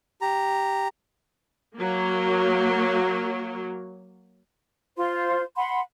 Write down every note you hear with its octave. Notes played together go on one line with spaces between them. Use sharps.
G4 A#5
F#3 A#3
F4 C5 C6
F#5 B5 C6